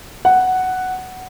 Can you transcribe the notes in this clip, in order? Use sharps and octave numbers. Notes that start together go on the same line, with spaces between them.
F#5